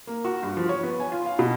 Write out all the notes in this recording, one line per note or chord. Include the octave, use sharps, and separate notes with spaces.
A#3
F#4
G2
F3
C#5
B3
G#5
F4
F5
B2